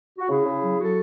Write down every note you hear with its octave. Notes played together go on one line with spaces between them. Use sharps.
F#4
C#3 E4 G#4
C#3
F#3
F#3 F#4 A4